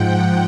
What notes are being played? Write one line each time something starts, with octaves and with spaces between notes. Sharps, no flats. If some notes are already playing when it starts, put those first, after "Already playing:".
Already playing: G#2 F3 F#5 G5